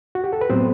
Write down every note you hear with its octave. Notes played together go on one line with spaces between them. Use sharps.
F#4
G4
A4
B4
A2 F#3 B3 C4 C5